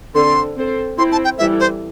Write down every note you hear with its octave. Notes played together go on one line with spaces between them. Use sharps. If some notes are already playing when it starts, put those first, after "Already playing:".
D3 C4 A4 C6
C4 A4 C5
C4 E4 C5 C6
A5
G5
E3 G3 E4 A4 E5
C5